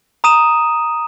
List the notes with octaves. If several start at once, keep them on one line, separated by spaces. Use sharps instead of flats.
A#5 D#6 D#7 E7